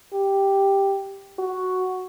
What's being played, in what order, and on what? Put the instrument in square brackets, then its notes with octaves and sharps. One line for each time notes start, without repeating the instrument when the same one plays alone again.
[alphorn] G4
F#4